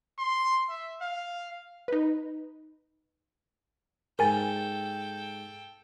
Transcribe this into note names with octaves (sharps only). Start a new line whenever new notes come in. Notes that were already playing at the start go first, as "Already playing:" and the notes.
C6
E5
F5
D#4 B4
G#2 A4 A#4 G5 G#5 A6